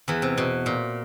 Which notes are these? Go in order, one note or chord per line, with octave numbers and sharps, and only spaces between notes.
E2 E3
C3
B2
A#2